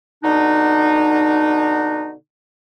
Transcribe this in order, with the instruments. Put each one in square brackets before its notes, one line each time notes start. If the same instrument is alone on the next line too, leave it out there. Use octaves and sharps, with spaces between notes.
[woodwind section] B2 D3 D4 D#4